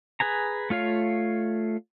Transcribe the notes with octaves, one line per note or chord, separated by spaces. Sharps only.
G#4 B4 G#5 A#5
A3 F4 C#5 F5